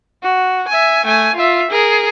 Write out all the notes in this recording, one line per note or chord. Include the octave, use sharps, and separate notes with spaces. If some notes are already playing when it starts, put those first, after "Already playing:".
F#4
E5 G#5
A3 G#5
F4 E5
G#4 A#4